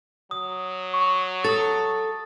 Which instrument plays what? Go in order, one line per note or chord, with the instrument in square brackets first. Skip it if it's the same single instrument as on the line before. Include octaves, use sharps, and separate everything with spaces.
[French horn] F#3 [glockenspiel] D#6
[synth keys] C#6
[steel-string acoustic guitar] A4 [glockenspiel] D#6 A6